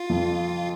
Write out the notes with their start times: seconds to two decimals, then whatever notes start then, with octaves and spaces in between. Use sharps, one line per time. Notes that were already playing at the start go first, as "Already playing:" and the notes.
Already playing: F4
0.09 F2